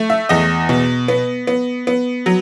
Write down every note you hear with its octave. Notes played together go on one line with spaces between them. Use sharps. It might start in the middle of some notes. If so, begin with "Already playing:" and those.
Already playing: A3
E5
E2 D#5
B2
B3
B3
B3
F#3